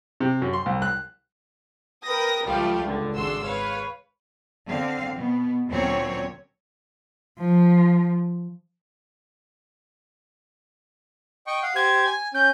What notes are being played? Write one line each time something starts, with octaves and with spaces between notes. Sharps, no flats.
C3
F#2
C6
C2
F#6
A#4 B4 G5 D#6 A#6
C#2 F3 G3 A3 G4 F5
C#2 D3
G#1 G#3 D4 F#4 C6 E6
B4 C#5 F5
D3 C4 F5
B2 B3
D2 A#2 F#3 C4 C#4 C#5
F3
D#5 G5 C#6
F5 F#5
G4 C5 G#6
G#5
C#4 G6